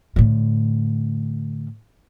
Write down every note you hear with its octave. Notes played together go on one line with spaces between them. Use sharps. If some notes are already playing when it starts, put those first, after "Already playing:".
A2 D3